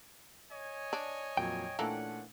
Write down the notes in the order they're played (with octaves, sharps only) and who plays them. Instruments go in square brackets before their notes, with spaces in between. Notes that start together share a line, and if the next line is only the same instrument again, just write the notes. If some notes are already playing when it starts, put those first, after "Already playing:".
[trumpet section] C#5 D#5 G#5
[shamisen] D4
[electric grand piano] F2 A#2 F#3 [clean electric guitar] G5
[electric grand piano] A#2 A3 D4 [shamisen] E3 A#3 A4 [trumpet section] C#4 F#5